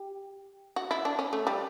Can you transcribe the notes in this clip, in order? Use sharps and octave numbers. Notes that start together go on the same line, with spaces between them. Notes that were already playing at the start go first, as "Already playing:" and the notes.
Already playing: G4
F#4
E4
D4
C#4
A3
G3